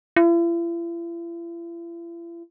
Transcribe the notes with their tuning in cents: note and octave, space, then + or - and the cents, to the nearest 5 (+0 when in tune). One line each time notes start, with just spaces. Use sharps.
E4 +45